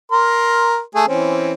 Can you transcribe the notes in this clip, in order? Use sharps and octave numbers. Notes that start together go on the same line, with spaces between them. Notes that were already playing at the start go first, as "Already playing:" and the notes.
A#4 C6
A3 G#4
E3 C4 C#4